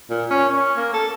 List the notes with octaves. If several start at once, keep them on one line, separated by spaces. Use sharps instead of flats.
A#2
C#4
C#5
A#3
A4